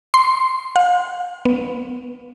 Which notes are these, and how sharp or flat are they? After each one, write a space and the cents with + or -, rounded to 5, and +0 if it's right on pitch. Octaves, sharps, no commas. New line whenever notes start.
C6 -10
F5 +40
B3 +0